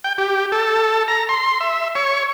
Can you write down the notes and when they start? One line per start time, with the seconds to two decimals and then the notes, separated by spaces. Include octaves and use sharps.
0.04 G5
0.18 G4
0.52 A4
1.08 A#5
1.29 C6
1.61 E5
1.95 C#5